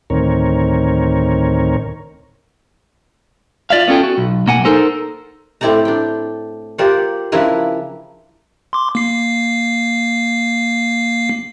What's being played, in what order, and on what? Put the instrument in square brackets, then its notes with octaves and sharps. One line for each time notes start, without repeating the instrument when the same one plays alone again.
[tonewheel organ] D2 A2 D#3 C4 A#4 C#5
[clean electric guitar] F4 D5 E5 F5
B3 C#4 F4 A4 G5
F#4
B1
B1 A#3 F#5 G#5
D#4 A4 A#4 C5
[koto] A2 C4 E4 D5 G5 A#5
D4 G5
F4 G4 A#4 C5 D5 F#5
C#3 F3 D4 E4 A#4 B4
[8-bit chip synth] C6 D6
A#3 C7